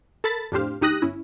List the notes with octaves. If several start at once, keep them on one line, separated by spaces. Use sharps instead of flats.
A4 A#4 A5 B5 A6
F2 A2 D4 G4 C5 F5
D2 D#4 G4 D#6 F#6 A#6
G1 C#4 E4